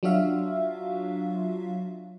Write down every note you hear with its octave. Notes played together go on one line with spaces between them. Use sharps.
F#3 D4 F4 F#4 E5 F5